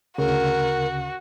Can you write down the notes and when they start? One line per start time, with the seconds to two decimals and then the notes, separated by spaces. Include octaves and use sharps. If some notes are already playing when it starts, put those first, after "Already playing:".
0.18 D2 C#3 F#4 A#4